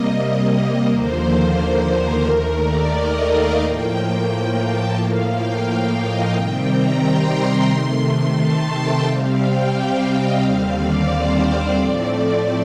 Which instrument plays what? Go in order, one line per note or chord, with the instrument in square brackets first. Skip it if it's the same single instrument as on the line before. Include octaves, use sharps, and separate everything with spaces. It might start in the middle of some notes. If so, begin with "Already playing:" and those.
Already playing: [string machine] C3 G3 A#3 D#5
D#2 D3 F3 A#3 C5
A#4
D#2 D#3 A3 A#4
D5
D#5
F5
A2 F3 A#3 G5
A5
A2 F3 A#3 F5
G5
D#5
C3 D#3 G3 C4 G5
A#5
C6
C6
C3 D#3 A3
A5
G5
C3 G3 C4 F5
G5
F5
D#5
D#2 D3 G3 C4 F5
D5
C5
D5
A2 F3 A3 C4